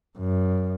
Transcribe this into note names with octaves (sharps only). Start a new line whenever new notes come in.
F#2